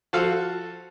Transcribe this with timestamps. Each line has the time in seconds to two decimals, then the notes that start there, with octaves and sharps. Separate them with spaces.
0.13 F3 F#4 A4 F5